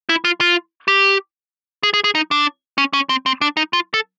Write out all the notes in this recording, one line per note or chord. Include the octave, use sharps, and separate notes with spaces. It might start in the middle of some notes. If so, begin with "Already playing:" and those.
E4
F4
F4
G4
G#4
G#4
G#4
D#4
D4
C#4
C#4
C4
C4
D4
D#4
F4
A4